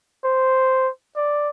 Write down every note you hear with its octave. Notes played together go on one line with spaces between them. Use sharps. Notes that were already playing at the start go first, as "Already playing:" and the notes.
C5
D5